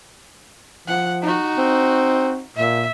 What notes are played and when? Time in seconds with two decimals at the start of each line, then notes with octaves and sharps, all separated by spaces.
0.88 F3 F#5
1.22 D#4 F#4
1.58 C4
2.57 A#2 E5